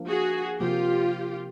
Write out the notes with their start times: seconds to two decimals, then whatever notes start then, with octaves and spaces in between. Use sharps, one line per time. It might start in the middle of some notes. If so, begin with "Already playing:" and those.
Already playing: F3 A#3 D4
0.08 F#4 G#4
0.60 C3 F3 A#3 F4 G4